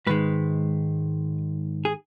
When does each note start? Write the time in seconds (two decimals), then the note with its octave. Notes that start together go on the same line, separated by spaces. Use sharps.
0.07 G#2 D#3 G#3 B4
1.85 G#4